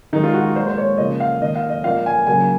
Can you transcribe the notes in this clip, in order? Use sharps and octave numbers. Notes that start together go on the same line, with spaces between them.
D#3 G#3 D#4
F4
F#4
A#2 G#3 C5
C5
C#5
C#3 F3 A#3 D#5
F5
D#3 A#3 D#5
F5
D#5
A#2 F3 A#3 F5
G#5
C#3 F#3 A#3 G#5